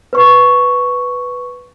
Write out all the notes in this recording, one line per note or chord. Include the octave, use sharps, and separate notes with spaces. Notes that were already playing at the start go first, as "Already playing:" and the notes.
B4 C#6